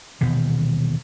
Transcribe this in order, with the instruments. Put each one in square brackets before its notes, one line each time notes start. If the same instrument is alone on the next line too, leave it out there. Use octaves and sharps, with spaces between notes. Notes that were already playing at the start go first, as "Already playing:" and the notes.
[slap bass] D#1 B2 D#3 E3